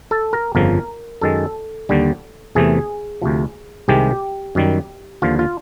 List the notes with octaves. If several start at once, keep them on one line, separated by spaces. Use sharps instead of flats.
A4
A#4
G1 F2 C#3 F3 A#4
F#2 D#3 G#3 A4
D#2 D3 G3
E2 C3 E3 A3 G#4
D2 C3 F3
C2 C3 D#3 G#3 G4
F#2 D#3 G3
D#2 D3 F3 F4
F4